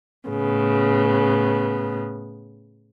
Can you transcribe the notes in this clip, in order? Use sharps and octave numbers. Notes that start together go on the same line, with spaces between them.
A2 C#3 B3